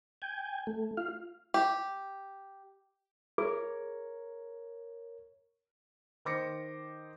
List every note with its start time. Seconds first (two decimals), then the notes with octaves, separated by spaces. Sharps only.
0.22 G5 G#5
0.67 A3
0.97 F4 F5
1.54 G4
3.38 G#4 A#4 C#5
6.25 D#3 C5 D6 A#6 C#7